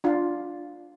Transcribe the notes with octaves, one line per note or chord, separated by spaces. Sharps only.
D4 F4